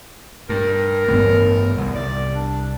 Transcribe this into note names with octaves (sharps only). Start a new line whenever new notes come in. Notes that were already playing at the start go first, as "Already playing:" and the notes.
G2 A#4
A1 G2 B3
C2
D5
D4